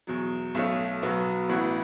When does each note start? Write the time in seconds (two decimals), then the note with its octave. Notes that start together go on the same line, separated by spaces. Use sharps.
0.07 E2 B2 F#3
0.55 B1 B2 A3 C#4
1.03 B1 B2 F#3 B3
1.49 A1 A2 E3 B3 F#4